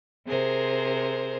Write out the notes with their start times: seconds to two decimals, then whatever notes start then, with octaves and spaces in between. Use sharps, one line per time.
0.26 C3 G#4 A#4 C5